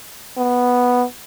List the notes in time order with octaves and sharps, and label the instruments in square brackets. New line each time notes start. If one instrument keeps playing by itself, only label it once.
[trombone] B3